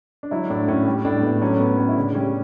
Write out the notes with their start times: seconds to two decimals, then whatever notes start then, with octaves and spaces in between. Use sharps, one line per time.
0.23 D4
0.31 F#3 E4
0.50 A2 D4
0.68 A2 C#4
0.86 G3
1.05 A2 D4
1.23 A2 B3
1.41 F#3 C#4
1.59 A2 B3
1.78 A2 C#4
1.89 E4
1.96 C#3 D4
2.15 G3 C#4